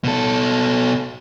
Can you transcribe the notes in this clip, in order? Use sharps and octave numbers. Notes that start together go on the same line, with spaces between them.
B2 A4